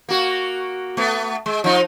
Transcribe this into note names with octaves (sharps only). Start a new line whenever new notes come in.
A#3 F#4
A3 B3
G#3
F3 D#4